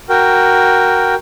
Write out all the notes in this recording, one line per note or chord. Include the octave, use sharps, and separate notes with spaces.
F#4 A#4 G5